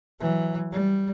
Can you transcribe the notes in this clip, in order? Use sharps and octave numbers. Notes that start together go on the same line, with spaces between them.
E3 F#3
G3